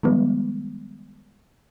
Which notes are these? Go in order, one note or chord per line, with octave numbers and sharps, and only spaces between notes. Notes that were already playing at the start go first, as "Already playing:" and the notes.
D#3 F3 G3 G#3 B3